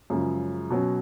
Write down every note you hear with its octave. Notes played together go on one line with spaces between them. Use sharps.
F#2 C#3 F3 G#3
B2 F#3 C#4